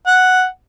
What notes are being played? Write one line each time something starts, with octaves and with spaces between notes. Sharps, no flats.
F#5